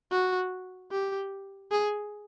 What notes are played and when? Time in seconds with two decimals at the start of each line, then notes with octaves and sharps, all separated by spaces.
0.12 F#4
0.91 G4
1.71 G#4